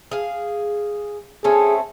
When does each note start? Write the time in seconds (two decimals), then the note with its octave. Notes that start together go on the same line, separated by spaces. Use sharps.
0.11 G#4 F5
1.44 A3 C4 C#4 G#4